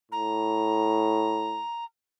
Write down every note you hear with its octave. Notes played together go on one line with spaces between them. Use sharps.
A2 A#5